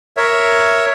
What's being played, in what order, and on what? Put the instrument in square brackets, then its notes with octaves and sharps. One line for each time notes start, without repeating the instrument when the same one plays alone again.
[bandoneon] A#4 C#5 E5